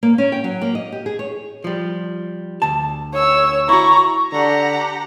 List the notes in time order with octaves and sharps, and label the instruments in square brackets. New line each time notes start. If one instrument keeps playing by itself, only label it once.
[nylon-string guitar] A#3
C#4
G5
F#3
A#3
D#5
G4
G#4
C#5
[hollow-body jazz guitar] F3 G3
D2 A5
[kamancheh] C#5 E6
[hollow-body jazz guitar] E4 F#4 [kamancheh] A#5 [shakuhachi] C#6
[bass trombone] D3 [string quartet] G4 F#5 A#5